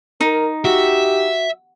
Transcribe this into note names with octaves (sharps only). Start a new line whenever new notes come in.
D#4 A#4
F#4 G4 E5